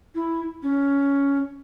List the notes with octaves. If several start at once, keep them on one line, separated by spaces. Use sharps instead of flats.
E4
C#4